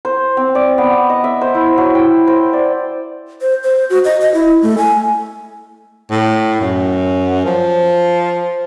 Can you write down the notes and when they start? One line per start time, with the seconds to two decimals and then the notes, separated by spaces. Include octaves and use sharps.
0.05 C5
0.37 C4
0.55 D5
0.78 B3
1.10 D#5
1.24 E5
1.41 C5
1.54 E4
1.78 F#3
1.95 G5
2.27 C5
2.53 D5
3.41 C5
3.64 C5
3.90 F#4
4.05 D#5
4.21 D#5
4.34 E4
4.63 A3
4.78 G#5
6.11 A2
6.61 F#2
7.45 F3